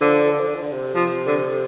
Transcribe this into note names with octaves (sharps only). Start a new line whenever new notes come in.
D3 F3
F3
D3
F3
D3
F3
D3
C3
C3 F3
D3